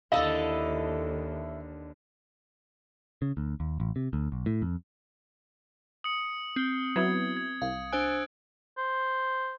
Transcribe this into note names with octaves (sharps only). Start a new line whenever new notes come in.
D#2 D3 E4 A4 D#5 F5
C#3
D2
D#2
A1
C3
D2
B1
A2
F2
D#6 C#7
C4 G7
F#3 B3 E4 G#6
G#6
C2 F5
D4 C5 G#5 E6 F#6 D7
C5